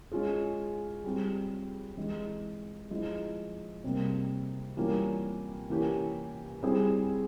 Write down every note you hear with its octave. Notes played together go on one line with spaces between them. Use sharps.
G#3 C#4 F4 G#4
G3 C4 G4
E3 G#3 E4
F3 G#3 E4
C3 G3 A#3
E3 G3 A#3 C#4 F4
E3 A#3 C#4 G4
G3 C4 E4 G#4